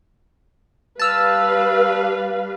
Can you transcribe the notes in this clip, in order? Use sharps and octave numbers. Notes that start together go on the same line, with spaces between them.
G3 B4 F5 A5 E6 F6